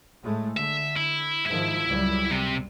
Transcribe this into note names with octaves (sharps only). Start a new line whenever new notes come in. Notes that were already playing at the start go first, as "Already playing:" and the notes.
A2 G#3 A3
D3 E5
E4
G#2 D#3 F3 E4 E5
C#2 F#2 G3
C3